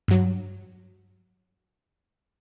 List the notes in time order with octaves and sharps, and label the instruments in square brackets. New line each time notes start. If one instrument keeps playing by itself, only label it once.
[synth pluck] G2 F#3